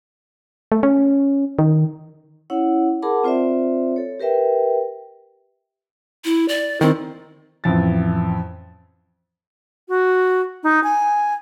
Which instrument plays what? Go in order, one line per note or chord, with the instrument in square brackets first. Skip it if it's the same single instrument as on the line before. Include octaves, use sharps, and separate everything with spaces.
[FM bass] A3
C#4
D#3
[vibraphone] C#4 E4 C#5 F#5
G#4 A#4 F#5 A5 B5 D6
C4 F4 C5 D5 E5
A4 C#5
G4 A#4 B4 E5 G5
[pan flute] E4
D5
[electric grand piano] D#3 C4 [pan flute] E4
[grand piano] A1 F2 A6
[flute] F#4
D#4
G#5